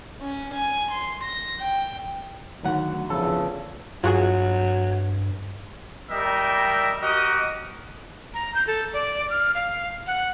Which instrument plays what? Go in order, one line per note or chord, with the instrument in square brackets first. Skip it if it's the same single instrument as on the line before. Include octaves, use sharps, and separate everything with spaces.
[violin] C#4
G#5
C6
A#6
G5
[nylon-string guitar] D2 F#5 [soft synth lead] D#3 [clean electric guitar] F#3
[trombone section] E2 C#3 [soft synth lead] F3 [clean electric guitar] A4
[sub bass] G2 [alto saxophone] F#3 [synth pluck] F4 F#4 G#4
[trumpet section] G3 A#4 D#5 E5 G5
F#4 G4 A#4 D#5
[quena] A#5
G6
A4
D5
F6
F5
F#5